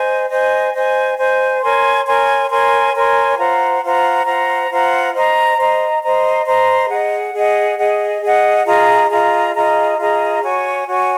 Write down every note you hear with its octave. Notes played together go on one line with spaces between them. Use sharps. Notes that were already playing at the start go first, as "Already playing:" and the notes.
Already playing: C5 D#5 G#5
C5 D#5 G#5
C5 D#5 G#5
C5 D#5 G#5
A#4 C#5 G#5 C6
A#4 C#5 G#5 C6
A#4 C#5 G#5 C6
A#4 C#5 G#5 C6
F4 C5 F#5 A#5
F4 C5 F#5 A#5
F4 C5 F#5 A#5
F4 C5 F#5 A#5
C5 D#5 A#5
C5 D#5 A#5
C5 D#5 A#5
C5 D#5 A#5
G#4 D#5 F#5
G#4 D#5 F#5
G#4 D#5 F#5
G#4 D#5 F#5
F4 G#4 D#5 A#5
F4 G#4 D#5 A#5
F4 G#4 D#5 A#5
F4 G#4 D#5 A#5
F#4 C#5 G#5
F#4 C#5 G#5